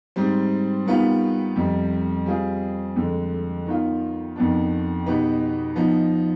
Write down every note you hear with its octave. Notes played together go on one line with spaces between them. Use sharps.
G#2 G3 C4
D#3 G3 B3 F4 B4
F2 C3 G3
G3 C4 F4 G#4
F2 D3 G#3
D#3 B3 F4
F2 D#3 B3 D4
B2 B3 D#4 G4 B4
F3 B3 D#4